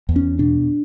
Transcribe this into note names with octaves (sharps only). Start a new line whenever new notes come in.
E2
C#4
B2 D4